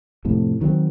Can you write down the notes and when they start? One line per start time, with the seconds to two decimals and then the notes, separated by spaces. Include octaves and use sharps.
0.25 F2 A2 C3
0.61 D#3 F#3 A3 C4